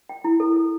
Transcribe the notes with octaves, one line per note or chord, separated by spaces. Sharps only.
G5
E4
A4
A4